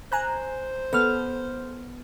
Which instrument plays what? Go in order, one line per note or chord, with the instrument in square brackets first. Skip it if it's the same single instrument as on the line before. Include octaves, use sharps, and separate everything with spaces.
[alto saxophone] C5 [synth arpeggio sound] G#5 A#5 F#6
[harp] B3 F6 [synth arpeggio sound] A4